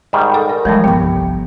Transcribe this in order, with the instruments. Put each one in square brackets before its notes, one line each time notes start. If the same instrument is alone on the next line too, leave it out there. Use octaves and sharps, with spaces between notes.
[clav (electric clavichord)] G#2 D#3 G3 [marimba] E5
[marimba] G4 A4 D5
A#4
[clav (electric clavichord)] D#2 A2 [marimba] E3 F3 G3 [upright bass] G#3
[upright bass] G1 C2 [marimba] B3 [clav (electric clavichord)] G4